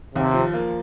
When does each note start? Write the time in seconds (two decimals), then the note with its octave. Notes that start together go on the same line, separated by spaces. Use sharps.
0.15 D#2 C3
0.34 F3
0.53 A#3